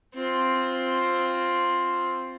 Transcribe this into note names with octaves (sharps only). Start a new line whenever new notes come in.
C4 F4